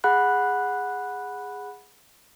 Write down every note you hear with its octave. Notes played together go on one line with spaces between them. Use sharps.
G#4 F#5 B5 F#6